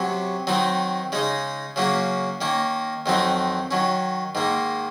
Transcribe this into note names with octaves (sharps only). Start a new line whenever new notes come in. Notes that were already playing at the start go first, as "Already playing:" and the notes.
Already playing: C3 F#3 C#4
D#3 F#3 C4 D#4
C#3 G#3 D#4
C#3 F#3 A#3 C#4
D#3 A#3 C#4
F2 D#3 F#3 C4 D#4
D#3 F#3 C#4
G#2 D#3 A#3